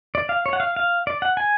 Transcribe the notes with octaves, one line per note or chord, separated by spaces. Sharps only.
D5
F5
C#5
F#5
F5
F5
D5
F#5
G#5